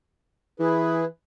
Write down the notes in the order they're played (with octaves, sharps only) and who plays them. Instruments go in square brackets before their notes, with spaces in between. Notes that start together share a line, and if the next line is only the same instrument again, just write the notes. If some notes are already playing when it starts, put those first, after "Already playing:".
[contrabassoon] E3 [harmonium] E4 G#4 B4